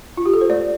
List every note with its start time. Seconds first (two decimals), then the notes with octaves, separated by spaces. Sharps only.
0.17 F4
0.26 G4
0.33 A4
0.41 C5
0.50 A3 D5